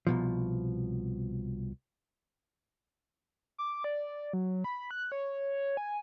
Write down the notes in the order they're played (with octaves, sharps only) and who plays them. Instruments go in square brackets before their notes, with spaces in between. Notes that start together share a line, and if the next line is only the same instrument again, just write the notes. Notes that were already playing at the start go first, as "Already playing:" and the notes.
[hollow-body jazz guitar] C2 B2 F3
[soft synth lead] D6
D5
F#3
B5
F#6
C#5
G#5